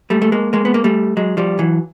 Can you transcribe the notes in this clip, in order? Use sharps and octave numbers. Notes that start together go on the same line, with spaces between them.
G3 A3
A3
G#3 A#3
G#3 A#3
B3
A#3
G3 A3
F#3 G#3
F3 G3
E3 F#3